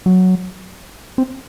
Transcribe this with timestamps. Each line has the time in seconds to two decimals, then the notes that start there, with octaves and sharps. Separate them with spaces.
0.06 F#3
1.18 C4